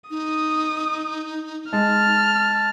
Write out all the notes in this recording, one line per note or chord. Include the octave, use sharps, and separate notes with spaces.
D#4 D#6
G#3 A5 F6